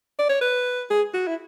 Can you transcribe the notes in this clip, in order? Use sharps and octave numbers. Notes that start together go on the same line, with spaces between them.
D5
C#5
B4
G#4
F#4
E4